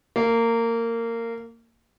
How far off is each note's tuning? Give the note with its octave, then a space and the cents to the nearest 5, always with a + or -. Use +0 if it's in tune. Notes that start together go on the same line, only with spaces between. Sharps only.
A#3 -20